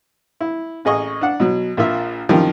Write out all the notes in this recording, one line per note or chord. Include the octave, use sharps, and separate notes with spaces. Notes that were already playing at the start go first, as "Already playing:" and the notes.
E4
A1 G#4 D#5 C#6
D4 F#5
B2 F#3
A#1 A#3 F4 E5
F#2 C3 D#3 F3 G3